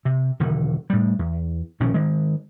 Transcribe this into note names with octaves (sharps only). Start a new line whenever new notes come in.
C3
E1 D3 D#3
A2 G3
E2
A#1 B2 D#3 C#4
D#3 G#3